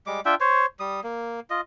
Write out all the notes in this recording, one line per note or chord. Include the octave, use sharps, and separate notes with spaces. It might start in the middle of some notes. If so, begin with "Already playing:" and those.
G3 G#3 D6
D4 F4 E5 G5
C5 C#5
G3 D#6
A#3
F4 D#5